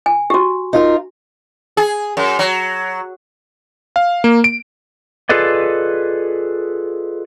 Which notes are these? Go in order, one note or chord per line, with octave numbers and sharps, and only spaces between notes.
G#5
F#4 G4
D#4 F4 A#4
G#4
F#2
F#3
F5
A#3
D7
F4 G#4 A4 B4 D5 D#5